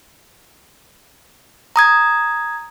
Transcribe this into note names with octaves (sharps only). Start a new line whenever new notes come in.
A#5 D#6 G#6